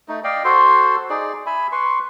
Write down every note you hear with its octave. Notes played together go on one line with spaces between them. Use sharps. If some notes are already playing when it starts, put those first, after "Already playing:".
A3 D#4
D5 D#5 F5 G5
F#4 A4 C5 C6
D#4 G#4 D5
E5 G#5 B5
B4 C6 C#6